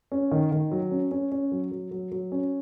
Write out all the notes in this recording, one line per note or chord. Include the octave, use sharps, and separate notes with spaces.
C#4
D#3
D#3
F#3
C#4
C#4
C#4
F#3
F#3
F#3
F#3
C#4